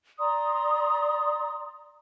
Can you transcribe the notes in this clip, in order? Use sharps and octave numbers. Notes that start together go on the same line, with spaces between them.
D5 A#5 C6 D#6